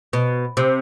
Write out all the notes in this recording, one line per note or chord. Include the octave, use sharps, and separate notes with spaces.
B2
C3